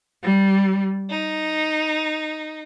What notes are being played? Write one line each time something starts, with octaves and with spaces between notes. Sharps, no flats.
G3
D#4